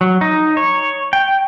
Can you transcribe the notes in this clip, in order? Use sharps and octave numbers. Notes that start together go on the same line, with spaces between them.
F#3
D#4
C#5
G5